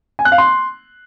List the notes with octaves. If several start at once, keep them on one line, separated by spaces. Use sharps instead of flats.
G#5
F#6
F5
C6